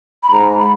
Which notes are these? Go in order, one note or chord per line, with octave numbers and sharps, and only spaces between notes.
B5
G#2 A#5
B5